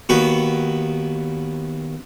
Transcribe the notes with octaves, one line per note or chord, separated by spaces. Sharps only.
D#2 B3 F#4